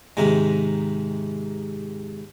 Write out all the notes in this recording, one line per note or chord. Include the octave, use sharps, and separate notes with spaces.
G#2 C3 D#3 G#3